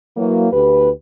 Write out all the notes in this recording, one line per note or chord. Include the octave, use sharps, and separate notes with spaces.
E3 F#3 A#3
D2 G4 B4